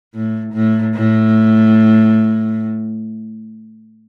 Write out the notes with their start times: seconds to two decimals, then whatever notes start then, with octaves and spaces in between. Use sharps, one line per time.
0.14 A2
0.54 A2
0.95 A2